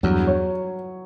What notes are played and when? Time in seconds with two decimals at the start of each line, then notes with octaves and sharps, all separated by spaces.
0.03 E2 G2 F#3
0.27 C#5